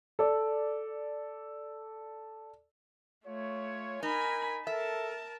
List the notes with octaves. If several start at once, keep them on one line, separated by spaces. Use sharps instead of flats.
A4 D5
A3 F4 C#5
D#4 A#4 G#5 B5
A4 A#4 E5 A5